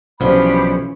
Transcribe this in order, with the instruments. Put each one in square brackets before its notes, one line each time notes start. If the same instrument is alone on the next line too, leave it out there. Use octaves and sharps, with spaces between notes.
[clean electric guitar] B1 [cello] E3 C#4 [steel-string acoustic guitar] F3 [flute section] D4 G4 B5